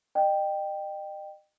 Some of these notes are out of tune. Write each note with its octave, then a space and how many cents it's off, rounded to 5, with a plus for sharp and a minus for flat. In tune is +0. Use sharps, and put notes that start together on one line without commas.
D#5 -40 G5 +0